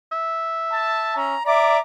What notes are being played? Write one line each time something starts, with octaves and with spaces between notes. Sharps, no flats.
E5
A5
C#4 A#5
D5 E5 A#5 D6